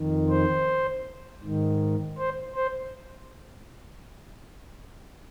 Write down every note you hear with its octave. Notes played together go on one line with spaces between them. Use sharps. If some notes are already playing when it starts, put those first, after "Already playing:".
Already playing: F2 D#3
C5
G#2 D#3
C5
C5